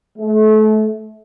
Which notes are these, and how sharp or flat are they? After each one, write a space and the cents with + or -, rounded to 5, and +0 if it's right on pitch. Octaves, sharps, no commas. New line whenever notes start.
A3 -30